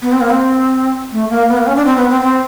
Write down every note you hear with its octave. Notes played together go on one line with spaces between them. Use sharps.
B3
C4
A#3
C4
A3
A#3
B3
A#3
C#4
D4
C4
B3
C4
C4